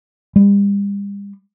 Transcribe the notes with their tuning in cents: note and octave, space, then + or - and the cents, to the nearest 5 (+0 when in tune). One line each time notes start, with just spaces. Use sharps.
G3 +40